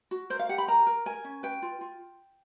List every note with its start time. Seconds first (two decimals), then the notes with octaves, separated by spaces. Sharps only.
0.11 F#4
0.30 A#4 C5
0.39 F5
0.49 G4 F#5
0.58 B5
0.68 A#4 A#5
0.87 A#4
1.06 A#4 G#5
1.24 C#4
1.43 B4 G5
1.62 F4
1.81 F4